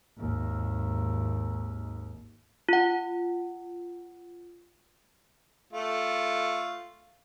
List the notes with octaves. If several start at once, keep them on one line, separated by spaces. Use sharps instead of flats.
G#1 D#2
F4 F#5
A3 F4